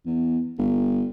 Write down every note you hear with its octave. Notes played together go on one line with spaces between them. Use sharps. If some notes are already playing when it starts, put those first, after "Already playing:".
E2
G1